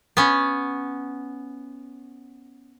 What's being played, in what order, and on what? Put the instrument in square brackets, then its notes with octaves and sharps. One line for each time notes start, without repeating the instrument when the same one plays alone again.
[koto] B3 C#4